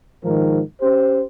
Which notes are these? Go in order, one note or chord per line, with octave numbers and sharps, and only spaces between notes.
G#2 D#3 F3 A#4
C#4 G4 C5